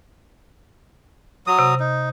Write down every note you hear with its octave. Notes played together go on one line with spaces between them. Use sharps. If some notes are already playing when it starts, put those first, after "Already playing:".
F#3 D#6
C3
D#4